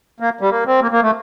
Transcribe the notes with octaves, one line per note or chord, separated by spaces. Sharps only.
A#3
G3
A#3
C4
A#3
A#3
A3